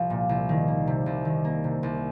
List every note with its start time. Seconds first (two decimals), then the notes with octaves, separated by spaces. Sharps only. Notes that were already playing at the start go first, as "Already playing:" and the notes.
Already playing: C2 F3
0.10 A#2
0.29 C2
0.49 D#3
0.68 A#3
0.87 C3
1.06 C2
1.25 D#3
1.44 A#3
1.64 C3
1.83 C2